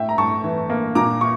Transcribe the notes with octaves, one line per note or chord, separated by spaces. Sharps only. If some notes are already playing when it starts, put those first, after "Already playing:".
Already playing: A2 E5 G5
A#5
A2 A5 C#6
E3
A#3
A#2 A#5 D6
C#6